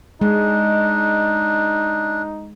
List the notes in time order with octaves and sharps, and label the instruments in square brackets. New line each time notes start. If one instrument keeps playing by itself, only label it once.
[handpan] G#3 [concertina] D4 [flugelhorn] D#4